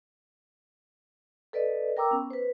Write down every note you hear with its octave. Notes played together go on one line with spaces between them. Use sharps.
A4 B4 D5 D#5
A#4 G5 A#5 D6 E6
B3 C#4
B4 C5